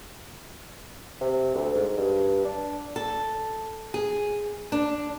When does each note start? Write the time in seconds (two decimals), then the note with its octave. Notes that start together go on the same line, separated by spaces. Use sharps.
1.21 C3
1.54 D2
1.76 G#2
1.97 G2
2.45 D4
2.96 A4
3.94 G#4
4.72 D4